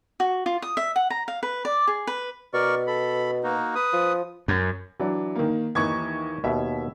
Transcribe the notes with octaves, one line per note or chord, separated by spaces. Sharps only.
F#4
F4
D#6
E5
F#5
A#5
F5
B4
D5
G#4
B4
B2 A#4 D5 C#6
A4 B5
A#3 D#4 F#4
B4 D#6
F3
F#2
E3 F#3 D4
D#3 A#3
D#2 E3 D#4 C#6 G#6
D#2 B2 E5